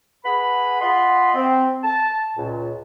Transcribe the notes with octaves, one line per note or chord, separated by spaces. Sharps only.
G#4 B4 F#5 B5
F4 D#5 F#5 B5 C6
C4
A5
C#2 A#2